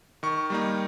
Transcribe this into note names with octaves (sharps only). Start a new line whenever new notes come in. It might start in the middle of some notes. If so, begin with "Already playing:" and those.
D#3 C#6
G3 A#3 D#4